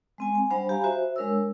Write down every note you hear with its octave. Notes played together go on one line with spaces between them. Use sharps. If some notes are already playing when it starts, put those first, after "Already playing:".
G#3 C4 G#5
G#5
G3 D4 C5 F#5 B5
G4 F5 G#5 A#5 B5
F#4 C5 E5
G#3 D4 A#4 C#5 E6